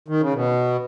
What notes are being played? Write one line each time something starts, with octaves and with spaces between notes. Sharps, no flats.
D#3
C#3
B2